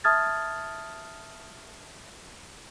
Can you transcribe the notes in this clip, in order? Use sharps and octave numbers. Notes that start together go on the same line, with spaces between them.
E5 A5 D#6 F6 G#6 A6